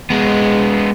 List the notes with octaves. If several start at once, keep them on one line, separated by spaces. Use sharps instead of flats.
G#3 B3